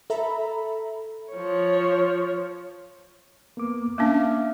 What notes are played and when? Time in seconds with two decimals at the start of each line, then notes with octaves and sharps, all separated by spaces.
0.10 A4 E5 A#5 B5
1.33 F3 C#5
3.57 A#3 B3 D6
3.98 A#3 C#4 D4 E5 F5 D6